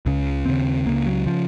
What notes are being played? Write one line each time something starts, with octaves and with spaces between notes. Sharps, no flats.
C#2 C#3
D#2 C#3 C4
C#2 C#3 A#3
F#3
C#3 F3